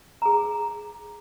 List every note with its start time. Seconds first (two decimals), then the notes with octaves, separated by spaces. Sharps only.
0.22 G#4 A#5